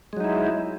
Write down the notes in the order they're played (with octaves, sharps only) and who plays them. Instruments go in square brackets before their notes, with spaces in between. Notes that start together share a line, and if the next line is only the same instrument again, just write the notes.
[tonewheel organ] G#3
F#3
D#4
E4